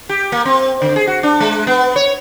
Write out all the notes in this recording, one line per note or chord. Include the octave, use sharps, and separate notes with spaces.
G4
A#3
C4
D3
G#4
F#4
D4
G#3
B3
C#5